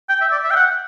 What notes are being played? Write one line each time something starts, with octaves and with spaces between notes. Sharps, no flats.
G5
E5
D5
E5
G5
F#5